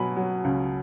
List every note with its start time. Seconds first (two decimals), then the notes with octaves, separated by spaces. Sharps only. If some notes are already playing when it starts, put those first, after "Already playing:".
Already playing: B2 F#3 G#5 B5
0.16 F#3
0.44 C#2